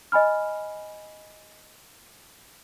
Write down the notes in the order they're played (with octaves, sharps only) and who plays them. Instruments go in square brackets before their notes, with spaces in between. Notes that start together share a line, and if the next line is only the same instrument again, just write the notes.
[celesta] D#5 G#5 B5 F6